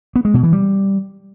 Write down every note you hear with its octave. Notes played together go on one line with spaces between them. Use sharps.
B3
G#3
B2
E3
G3